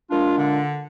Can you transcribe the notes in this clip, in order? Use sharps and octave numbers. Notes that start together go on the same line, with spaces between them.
A#2 G#3 D4 F4
D3